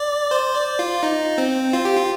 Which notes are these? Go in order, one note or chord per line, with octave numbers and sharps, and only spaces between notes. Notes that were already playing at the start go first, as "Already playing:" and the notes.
Already playing: D5
C5
D5
F4
D#4
C4
F4
G4
F4